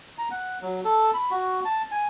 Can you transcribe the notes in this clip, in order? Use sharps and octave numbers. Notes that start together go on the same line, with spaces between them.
A#5
F#5
F#3
A4
B5
F#4
A5
G#5